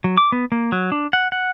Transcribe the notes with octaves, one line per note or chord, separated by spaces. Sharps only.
F#3
D6
B3
A#3
F#3
D4
F#5
F#5